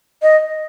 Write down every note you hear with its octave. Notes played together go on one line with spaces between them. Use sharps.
D#5